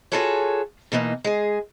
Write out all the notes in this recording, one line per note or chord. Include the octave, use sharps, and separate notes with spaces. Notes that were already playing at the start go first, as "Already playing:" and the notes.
F4 F#4 G#4 A4 B4 C#5
B2 E3 A#3 D#4
G#3 G#4